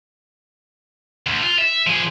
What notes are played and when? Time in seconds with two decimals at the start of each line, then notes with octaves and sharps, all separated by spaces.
1.27 D2
1.43 F4
1.58 E5
1.87 F3 G#4